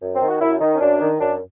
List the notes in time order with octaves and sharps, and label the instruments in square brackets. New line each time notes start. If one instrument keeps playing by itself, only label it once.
[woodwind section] F#2
C4
D#3
F#4
F#2 E4
D#3 D#4
C#4
F#2 D4
D#3
F#2 D4